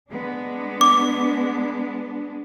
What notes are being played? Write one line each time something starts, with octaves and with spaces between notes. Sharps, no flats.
G#3 B3 D4
D6